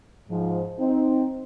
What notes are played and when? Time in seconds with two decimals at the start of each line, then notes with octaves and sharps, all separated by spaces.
0.30 G#2 F3
0.80 C4 D#4